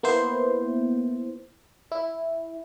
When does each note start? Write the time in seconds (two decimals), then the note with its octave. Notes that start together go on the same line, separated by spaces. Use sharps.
0.03 A#3 B3 E4 C5
1.92 E4